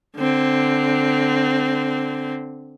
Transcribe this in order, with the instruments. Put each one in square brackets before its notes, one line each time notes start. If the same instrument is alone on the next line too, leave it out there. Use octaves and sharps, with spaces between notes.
[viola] D3 C4